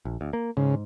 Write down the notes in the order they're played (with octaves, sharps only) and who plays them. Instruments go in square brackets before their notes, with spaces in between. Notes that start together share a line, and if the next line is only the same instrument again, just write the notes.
[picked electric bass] A#1
D2
A#3
[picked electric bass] G#2 [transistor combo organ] C#3